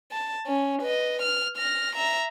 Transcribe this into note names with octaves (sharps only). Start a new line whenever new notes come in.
A5
C#4
B4 D#5
F6
F6 A#6
E5 A#5